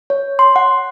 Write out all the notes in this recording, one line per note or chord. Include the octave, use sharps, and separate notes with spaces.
C#5
C6
F#5